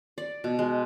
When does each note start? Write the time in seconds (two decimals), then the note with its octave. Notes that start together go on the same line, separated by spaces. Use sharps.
0.18 D5
0.44 B2
0.59 G#3